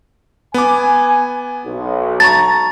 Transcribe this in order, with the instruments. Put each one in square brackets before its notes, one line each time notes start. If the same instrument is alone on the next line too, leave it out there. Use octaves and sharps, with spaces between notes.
[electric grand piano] B3 D6 [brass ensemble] G#5
[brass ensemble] B1
[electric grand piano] A5 A#5 C#6 [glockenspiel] A6